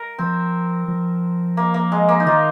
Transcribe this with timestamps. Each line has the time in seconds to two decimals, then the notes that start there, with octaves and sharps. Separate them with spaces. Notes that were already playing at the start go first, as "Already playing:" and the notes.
Already playing: A#4
0.19 F3 C4
0.88 F3
1.57 A#3
1.74 A#3
1.92 G#3
2.09 A#3
2.20 D#4
2.26 D#3 F4